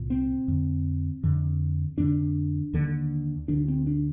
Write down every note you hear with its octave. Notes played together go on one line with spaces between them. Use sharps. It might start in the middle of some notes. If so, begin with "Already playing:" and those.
Already playing: C2 A#2
C4
F2 D3
F2 D3
F2 D3 D4
D#2 D3
D2 D3 D4
C4
D4